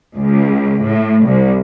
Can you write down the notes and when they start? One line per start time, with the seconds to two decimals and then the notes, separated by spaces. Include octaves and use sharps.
0.17 C#2
0.85 A2
1.27 C2